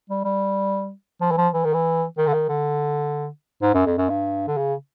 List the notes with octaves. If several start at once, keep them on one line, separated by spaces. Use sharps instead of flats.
G3
G3
F3
E3
F3
E3
D#3
E3
D#3
D3
D#3
D3
G#2
F#2
F2
F#2
G2
D3
C#3